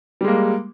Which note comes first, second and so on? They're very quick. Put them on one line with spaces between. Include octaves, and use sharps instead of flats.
G3 G#3 A#3